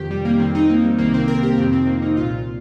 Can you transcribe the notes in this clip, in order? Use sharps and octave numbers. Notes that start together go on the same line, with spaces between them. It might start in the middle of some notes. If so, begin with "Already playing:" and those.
Already playing: F2 C3 D#3 G4
G3
A#3
F2 D#3 C4
D#4
A#3
G3
C2 C3 D#3 A#3
C4
A#4
G4
F2 C3 D#3 C4
C4
A#3
D#4
C2 A#2 F4